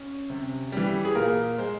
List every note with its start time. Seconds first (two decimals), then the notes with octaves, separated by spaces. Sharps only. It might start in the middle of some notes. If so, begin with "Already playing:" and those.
Already playing: C#4
0.30 C3
0.72 E3 G3
1.05 G#4
1.15 A#2 A#4
1.58 G#3 C5